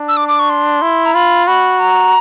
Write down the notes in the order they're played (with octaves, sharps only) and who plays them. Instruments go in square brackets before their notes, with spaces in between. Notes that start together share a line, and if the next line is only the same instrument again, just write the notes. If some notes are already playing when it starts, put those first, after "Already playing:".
Already playing: [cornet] D4
[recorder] E6
D6
D6
C#6
C6
[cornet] E4
[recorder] A#5
[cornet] F4 [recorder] B5
[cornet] F#4 [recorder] B5
[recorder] A#5